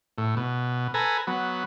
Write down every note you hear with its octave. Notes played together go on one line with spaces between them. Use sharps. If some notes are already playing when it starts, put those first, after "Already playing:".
A2
B2
A4 B4 G#5 A#5
F#3 B3